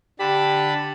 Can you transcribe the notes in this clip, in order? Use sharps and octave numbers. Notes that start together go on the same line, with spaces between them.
D3 G4 A5 B5